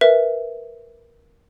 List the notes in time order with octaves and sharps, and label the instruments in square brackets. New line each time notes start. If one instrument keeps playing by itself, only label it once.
[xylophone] A#4 B4 E5